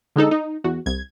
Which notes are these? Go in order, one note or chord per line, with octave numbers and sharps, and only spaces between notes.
D3 G#3 D#4 A4
D#4
E2 F#4
C2 G#6